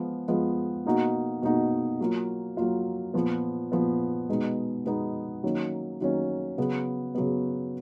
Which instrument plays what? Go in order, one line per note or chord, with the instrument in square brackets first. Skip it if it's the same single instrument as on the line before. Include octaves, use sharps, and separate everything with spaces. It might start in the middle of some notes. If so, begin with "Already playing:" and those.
Already playing: [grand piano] F3 G#3 B3 F4
F3 G#3 B3 F4
B2 A#3 D#4 F#4
B2 A#3 D#4 F#4
F#3 A#3 F4
F#3 A#3 F4
A#2 F3 B3
A#2 F3 B3
B2 G#3 B3 D#4
B2 G#3 B3 D#4
D#3 F#3 A#3 C#4
D#3 F#3 A#3 C#4
C#3 F#3 B3
C#3 F#3 B3